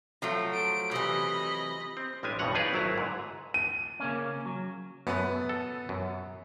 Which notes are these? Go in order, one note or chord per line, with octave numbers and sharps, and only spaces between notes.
F3 F#3 A3
D7
C3 E3 D#5 B5
C4
A1 G3 G#3 D4 G4 G#5
B1 G2 B2 E3 F#5 A#5
D#4 F4 G#4 B4 C#5 D5
G#1 F#3 A3 E4 A#5
G#2 D3
D#7
C#3 A#3 C#4
F#3
F#2 A3 B3 B4
A4
F#2